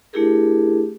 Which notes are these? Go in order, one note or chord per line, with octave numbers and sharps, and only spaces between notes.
A3 D4 E4 G4 G#4 A#4